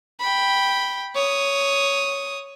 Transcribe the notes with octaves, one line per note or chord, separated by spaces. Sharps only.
G5 B5
C#5 D#6